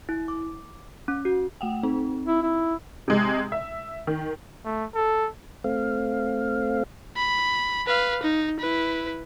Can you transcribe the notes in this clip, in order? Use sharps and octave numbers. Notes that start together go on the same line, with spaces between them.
E4
D6
C#4
F#4
A3 F#5 G5
C4 D#4
E4
E4
C3 G#3
E5
D#3
A3
A4
A3 C4 F5
B5
B4 F5
D#4
E4 B4